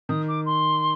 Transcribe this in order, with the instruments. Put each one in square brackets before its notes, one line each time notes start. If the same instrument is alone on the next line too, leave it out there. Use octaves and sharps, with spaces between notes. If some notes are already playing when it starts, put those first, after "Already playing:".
[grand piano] D#3 [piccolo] D#6
[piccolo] D6
C6